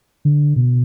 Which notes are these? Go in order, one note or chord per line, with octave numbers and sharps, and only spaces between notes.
D3
B2